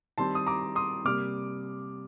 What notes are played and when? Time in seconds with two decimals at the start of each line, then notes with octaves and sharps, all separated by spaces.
0.18 D#3 G3 C4 A5 C6
0.35 D#6
0.47 A#5 D6
0.76 C6 D#6
1.05 C3 G3 A#3 D6 F6